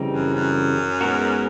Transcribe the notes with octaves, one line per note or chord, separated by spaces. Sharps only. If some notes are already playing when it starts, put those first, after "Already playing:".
Already playing: C#3 E3 G3 C4 D#4
F#2
F#2
G#3 B3 D#4 F#4 A#4